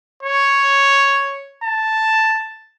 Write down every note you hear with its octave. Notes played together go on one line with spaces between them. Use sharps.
C#5
A5